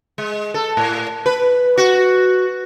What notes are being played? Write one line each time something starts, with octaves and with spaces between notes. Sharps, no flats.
G#3
A4
A2
B4
F#4